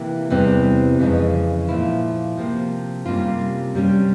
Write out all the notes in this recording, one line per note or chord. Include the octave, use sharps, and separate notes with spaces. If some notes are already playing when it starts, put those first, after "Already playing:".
Already playing: C3 E3 A#3 E4
E2 C3 E3 G3 C4
F2 C#3 E3 G#3 C#4
A#2 F3 A#3 E4
C3 F3 A#3
C3 G3 A#3 C#4 F4
C3 G3 C#4